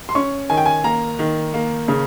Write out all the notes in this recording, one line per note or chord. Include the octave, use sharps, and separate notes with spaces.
C6
C#4 C#6
D#3 G#5
G5
G#5
A#3 A#5
D#3
A#3
C#3